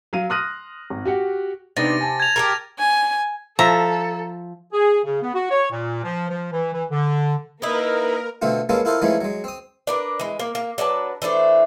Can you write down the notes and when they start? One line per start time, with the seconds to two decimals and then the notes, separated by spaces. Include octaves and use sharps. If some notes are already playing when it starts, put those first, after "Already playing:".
0.13 F#3 F5 D#7
0.30 C6 D#6 F6 F#6 A#6 D#7
0.90 G#1
1.05 F#4 G4 F#5
1.77 C3 B3 D4 D#4 A6 A#6 D#7
2.01 G#5 A5
2.20 G#6 F7
2.36 G4 A4 A#4 A5 A6
2.79 G#5
3.59 F3 A4 E5 A#5
4.72 G#4
5.04 C#3
5.22 B3
5.34 F#4
5.51 C#5
5.71 A#2
6.04 F3
6.29 F3
6.52 E3
6.73 E3
6.91 D3
7.62 A#3 D#4 E4 A#4 B4
8.42 B2 D3 A3 C4 F4
8.69 G#3 A#3 B3 C#4 F4 A4
8.85 E4 F4 A4 A#4 C5 D#5
9.02 E3 F3 G#3 A3 C#4 D#4
9.21 F#3 G#3
9.44 C4 D#6
9.87 D4 A#4 B4
10.19 E3 G#3
10.39 A#3
10.55 A#3
10.78 F#3 D4 B4 A5
11.22 E3 A3 D4 C5